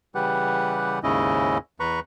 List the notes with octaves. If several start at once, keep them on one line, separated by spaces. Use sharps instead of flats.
C#3 E3 G3 G4 B4 F#5
D#2 G#2 C#3 C#4 E4 D#5
E2 B4 A#5 B5 C#6